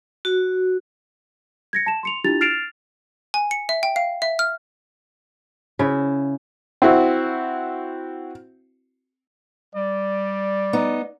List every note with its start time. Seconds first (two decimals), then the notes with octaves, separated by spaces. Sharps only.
0.25 F#4
1.73 G#6 A#6 C#7
1.86 A5 E7
2.03 C6 C#7 F7
2.24 D4 E4 F4 G4 A6 F7
2.41 F6 A6 C7 D7 E7 F7
3.34 G#5
3.51 C#7
3.69 E5
3.83 G5
3.96 F5
4.22 E5
4.39 F6
5.79 C#3 E4
6.82 C4 E4 F#4
9.75 G3 D5
10.73 B3 D#4